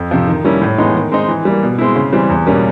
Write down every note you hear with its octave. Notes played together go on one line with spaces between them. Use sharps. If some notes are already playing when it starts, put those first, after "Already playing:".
Already playing: F2
C3 F3
D#3
G3 A#3 C#4 E4
A2
E3 G#3 B3 D#4
D#3
G#3 C4 D#4
E3
G3 A#3
B2
G#3 C4 E4
C#3
E3 G3 C4
E2
B2 G3 A#3 C#4